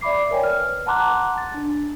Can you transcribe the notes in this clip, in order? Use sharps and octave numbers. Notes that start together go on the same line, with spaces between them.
D5 E5 B5 D6 C7
A#4 C#5 D5 G5 G#5
B4 F6
F#5 A5 A#5 C6 D6 F#6
A6
D4